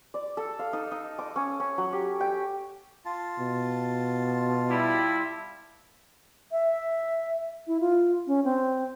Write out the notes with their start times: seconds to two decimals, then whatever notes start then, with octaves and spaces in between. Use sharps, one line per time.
0.14 D5
0.37 A4
0.59 F5
0.73 D#4
0.91 D#4
1.19 D6
1.36 C#4
1.60 C#4
1.78 F#3
1.93 G4
2.20 G5
3.05 F4 A5
3.39 B2
4.70 G3 E4
6.52 E5
7.67 E4
7.80 F4
8.27 C#4
8.45 C4